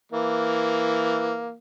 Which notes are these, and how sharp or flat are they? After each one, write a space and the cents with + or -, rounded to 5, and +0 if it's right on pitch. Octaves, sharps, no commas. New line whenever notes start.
E3 +0 A#3 +0